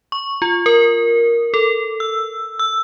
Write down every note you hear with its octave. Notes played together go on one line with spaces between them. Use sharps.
C#6
F4
A#4
A4
E6
E6